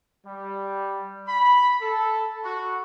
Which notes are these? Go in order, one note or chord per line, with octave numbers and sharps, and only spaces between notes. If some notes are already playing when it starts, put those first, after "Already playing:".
G3
B5
A4
F#4